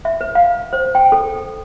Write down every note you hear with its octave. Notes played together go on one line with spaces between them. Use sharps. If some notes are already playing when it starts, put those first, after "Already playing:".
E5
B4
F5
C5
G5
A4